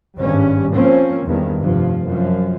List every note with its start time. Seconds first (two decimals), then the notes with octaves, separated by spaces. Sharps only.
0.18 G#1 G2 G3 C#4
0.74 F3 A#3 C4 C#4
1.25 E2 G2 D#3
1.59 F1 G2 F3
2.06 F#2 F3